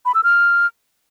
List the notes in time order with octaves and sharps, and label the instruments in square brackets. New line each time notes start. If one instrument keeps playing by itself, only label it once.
[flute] B5
E6
F6